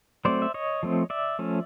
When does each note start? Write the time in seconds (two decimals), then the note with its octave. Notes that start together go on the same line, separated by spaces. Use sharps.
0.25 F#3 A3 C4 C5 D5
0.42 E5
0.54 C#5 D#5
0.83 F3 A3 C4
1.10 D5 E5
1.39 F3 A3 C#4